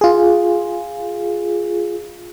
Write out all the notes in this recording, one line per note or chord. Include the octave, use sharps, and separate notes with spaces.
F4 G#4